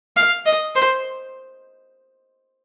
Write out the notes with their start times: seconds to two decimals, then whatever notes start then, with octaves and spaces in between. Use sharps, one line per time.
0.16 F5
0.46 D#5
0.75 C5